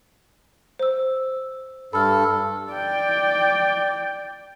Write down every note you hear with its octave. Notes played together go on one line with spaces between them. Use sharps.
C5 E6
G2 A4 B5 F6
D5 G5